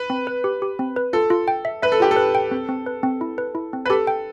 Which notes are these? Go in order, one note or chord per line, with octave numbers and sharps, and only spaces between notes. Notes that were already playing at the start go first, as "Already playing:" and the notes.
Already playing: B4
C4
B4
G4
G4
C4
B4
F4 A4
F4
G5
E5
B4 E5
A4
F4 G4
A4
B4
G5
C4
C4
B4
C4
E4
B4
E4
C4
B4
G4 A4
G5